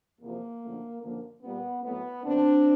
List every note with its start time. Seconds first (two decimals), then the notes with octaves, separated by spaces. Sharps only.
0.21 E2 C3 F3 A#3
0.61 F#2 D3 F3 A3
1.02 F#2 D3 F3 A#3
1.43 A#2 G3 A#3 B3
1.83 A2 F#3 A3 B3
2.24 F#2 D3 F#3 C4 D4